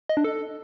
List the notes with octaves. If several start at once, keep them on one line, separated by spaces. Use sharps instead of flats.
D#5
D4
A4